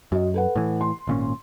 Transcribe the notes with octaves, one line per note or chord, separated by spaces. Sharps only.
F#2 F#4 D#5
A4 B4 F#5
A2 E3
C6
G#1 A#2 C#4